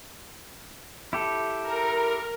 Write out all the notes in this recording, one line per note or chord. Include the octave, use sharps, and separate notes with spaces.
E4 G4 A4
A#4